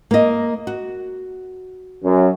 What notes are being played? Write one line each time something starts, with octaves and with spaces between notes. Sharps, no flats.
A#3 D#5
F#4
F#2